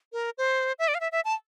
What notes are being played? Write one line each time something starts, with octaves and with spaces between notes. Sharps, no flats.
A#4
C5
E5
D5
F5
E5
E5
A5